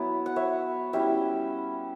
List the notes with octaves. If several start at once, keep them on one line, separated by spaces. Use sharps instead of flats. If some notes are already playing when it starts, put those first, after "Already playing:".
Already playing: F#3 B3 E4
F#5
C#5 E5
G3 C#4 E4 E5 G5